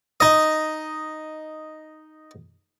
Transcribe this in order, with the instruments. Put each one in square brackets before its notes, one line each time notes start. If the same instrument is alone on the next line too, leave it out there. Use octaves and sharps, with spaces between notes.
[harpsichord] D#4 D#5